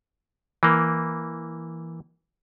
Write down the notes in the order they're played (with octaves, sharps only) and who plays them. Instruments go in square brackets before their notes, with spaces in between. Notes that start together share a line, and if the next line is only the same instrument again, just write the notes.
[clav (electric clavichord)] E3 A#3